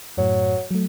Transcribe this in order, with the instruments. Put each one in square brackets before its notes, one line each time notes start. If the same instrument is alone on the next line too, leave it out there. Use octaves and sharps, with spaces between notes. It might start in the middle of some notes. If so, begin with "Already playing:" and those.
[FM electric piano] F#2 A2 [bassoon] F#3
[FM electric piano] F#3 A3